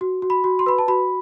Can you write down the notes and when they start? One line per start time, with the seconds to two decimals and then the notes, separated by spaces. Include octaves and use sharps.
0.01 F#4
0.22 F#4
0.30 B5
0.44 F#4
0.59 C6
0.66 B4 B5
0.78 A5
0.88 F#4 B5